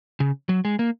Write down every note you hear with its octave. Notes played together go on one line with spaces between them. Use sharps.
C#3
F#3
G#3
A#3